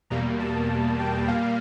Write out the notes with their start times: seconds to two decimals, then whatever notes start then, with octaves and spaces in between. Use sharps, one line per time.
0.10 E2 B2 G3 A#3 A#5
0.40 A5
0.99 G5
1.28 A#2 G3 A#3 F5